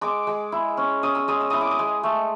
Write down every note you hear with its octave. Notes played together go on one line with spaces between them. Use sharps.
G#3 D6
G#3
E4
C#4
C#4 D#6
E6
G#3 D#6
E6
E4 D#6
D6
D#6
G#3
A3